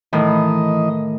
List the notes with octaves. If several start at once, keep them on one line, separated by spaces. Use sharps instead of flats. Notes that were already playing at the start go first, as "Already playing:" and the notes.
A2 D#3 E3 D#5